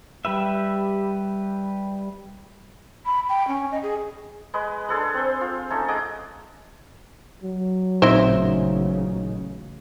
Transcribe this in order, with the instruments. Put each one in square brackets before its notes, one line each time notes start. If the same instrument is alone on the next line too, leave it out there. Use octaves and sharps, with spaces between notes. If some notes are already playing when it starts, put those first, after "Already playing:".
[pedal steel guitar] G3 G4 B4 E5
[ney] B5
G5
C#4
D#5
G#4
[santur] G#3 B4 D#5
D4 G#4 A4 B4
C4 C5
F4
A3 C#4 D#4 A4
G#4 D#5 F#5 D6
[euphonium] F#3
[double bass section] A1 C#3 [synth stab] A#2 D#4 [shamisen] C4 E4 C5